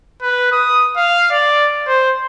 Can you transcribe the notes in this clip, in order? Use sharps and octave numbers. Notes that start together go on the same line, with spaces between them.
B4
D#6
F5
D5
C5